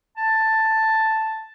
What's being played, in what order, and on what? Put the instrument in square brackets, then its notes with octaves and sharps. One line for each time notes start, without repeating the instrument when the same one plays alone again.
[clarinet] A5